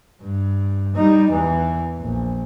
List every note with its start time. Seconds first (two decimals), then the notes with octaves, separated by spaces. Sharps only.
0.21 G2
0.96 G3 D#4
1.31 E2 E3
1.98 A#1